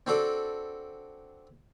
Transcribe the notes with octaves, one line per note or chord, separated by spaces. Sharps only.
C4 D4 F#4 A4 D5